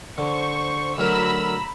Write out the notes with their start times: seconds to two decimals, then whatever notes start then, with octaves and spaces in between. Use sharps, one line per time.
0.18 D3 C5 C#6
0.98 D2 F#3 A#4 A#5 B5 E6